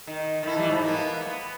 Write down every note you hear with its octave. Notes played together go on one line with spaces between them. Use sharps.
D#3
D#3 A3 E4
E3 G3
G#2
A#3 B3
B3